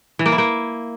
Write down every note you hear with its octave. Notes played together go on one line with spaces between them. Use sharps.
E3
A#3
E4
A#3